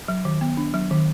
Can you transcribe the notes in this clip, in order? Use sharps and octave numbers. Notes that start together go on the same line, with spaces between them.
F#3
D#3
B3
D4
F#3
D#3